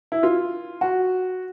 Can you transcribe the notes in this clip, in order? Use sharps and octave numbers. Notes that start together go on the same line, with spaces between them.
E4
F4
F#4